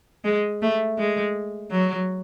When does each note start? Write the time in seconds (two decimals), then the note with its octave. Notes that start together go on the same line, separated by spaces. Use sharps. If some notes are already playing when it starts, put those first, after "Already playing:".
0.24 G#3
0.62 A3
0.98 G#3
1.71 F#3